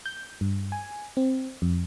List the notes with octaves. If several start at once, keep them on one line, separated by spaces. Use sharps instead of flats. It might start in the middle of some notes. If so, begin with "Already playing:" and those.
G6
G2
G#5
C4
F2